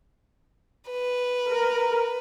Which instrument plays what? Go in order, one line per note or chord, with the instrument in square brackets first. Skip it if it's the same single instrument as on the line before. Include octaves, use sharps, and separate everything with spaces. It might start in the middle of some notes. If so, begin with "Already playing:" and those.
[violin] B4
[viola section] A#4